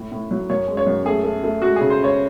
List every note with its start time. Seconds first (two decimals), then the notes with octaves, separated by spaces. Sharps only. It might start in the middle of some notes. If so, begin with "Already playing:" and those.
Already playing: A2
0.12 A2
0.31 F#3
0.50 F#2 C#5
0.68 G#3
0.77 C#5
0.87 F#2
1.06 A3 G#4
1.24 A3
1.44 A3
1.62 G#3 F#4
1.76 C#3 G#4
1.90 C5
2.00 C#2 C#5